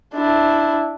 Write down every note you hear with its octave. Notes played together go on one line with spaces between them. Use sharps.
D4 E4